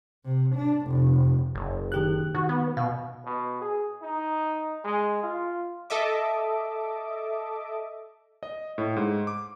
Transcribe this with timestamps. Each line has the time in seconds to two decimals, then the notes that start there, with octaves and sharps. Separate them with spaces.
0.25 C3
0.55 D4
0.87 F1
1.55 F#1
1.92 D#3 G4 F#6
2.35 D#3 F#4
2.49 B3
2.77 B2 F5
3.25 B2
3.61 G#4
4.02 D#4
4.84 G#3
5.23 F4
5.90 A4 D#5 E5 D6
8.43 D#5
8.78 A2
8.96 G#2
9.27 D6